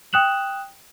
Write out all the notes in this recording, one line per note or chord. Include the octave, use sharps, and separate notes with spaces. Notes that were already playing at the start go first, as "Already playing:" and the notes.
G5 D#6 F#6 E7 F#7